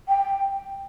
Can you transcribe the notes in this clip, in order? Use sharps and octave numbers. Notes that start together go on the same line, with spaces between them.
G5